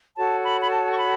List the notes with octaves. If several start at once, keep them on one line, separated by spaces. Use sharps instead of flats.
F#4 A4 C#5 A5
B5
B5
A5
C#6
B5